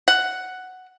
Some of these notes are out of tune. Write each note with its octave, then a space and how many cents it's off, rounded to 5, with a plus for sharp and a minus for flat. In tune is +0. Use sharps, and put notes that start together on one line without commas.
F#5 +5